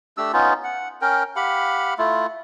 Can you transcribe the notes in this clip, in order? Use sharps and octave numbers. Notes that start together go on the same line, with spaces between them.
A3 D4 G4 E6
B3 C#4 D#4 F4
F#5
C#4 A#4 G5
G4 F5 F#5 B5
A3 E4 F4